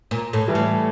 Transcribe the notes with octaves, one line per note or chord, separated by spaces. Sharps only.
A#2
A2
E3 G3
A2